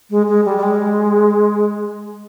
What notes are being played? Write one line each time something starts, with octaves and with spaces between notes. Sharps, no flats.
G#3
G#3
G3
G3
G#3